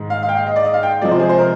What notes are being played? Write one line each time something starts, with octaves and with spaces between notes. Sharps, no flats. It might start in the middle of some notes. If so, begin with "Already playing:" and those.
Already playing: G#2 D#3 G#3
F5
F5
G5
F5
D#5
D5
D#5
F5
G5
C3 F3 G#3 D5
C5
G#4
C5
A#4